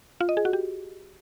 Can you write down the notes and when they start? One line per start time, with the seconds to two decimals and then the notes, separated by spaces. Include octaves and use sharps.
0.21 F4
0.29 D#5
0.37 G#4
0.45 F#4
0.53 G4